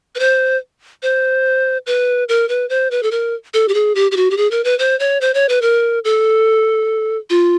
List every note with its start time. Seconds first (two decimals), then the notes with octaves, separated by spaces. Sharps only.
0.15 B4
0.19 C5
1.03 C5
1.86 B4
2.29 A#4
2.49 B4
2.69 C5
2.91 B4
3.03 A4
3.11 A#4
3.54 A4
3.68 G4
3.74 G#4
3.95 G4
4.11 G4
4.16 F#4
4.31 G4
4.37 G#4
4.51 A#4
4.64 B4
4.79 C5
5.00 C#5
5.21 C5
5.34 C#5
5.49 B4
5.62 A#4
6.05 A4
7.30 F4